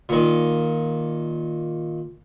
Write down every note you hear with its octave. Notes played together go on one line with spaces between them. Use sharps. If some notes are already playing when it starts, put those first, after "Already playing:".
A#2 D#3